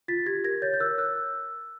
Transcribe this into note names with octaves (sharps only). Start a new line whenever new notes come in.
F4 A6 B6
G4 G#6 A#6
A#4 G#6 A#6
C#5 G6 A6
G6
A#4 E6 F#6
A#4 E6 F#6